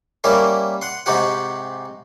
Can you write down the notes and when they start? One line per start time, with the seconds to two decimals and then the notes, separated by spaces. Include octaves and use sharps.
0.24 G3 A#3 C#4 E4 A#4
0.82 F#5 C6
1.06 G#2 C3 D#4 F#4 G4 F#5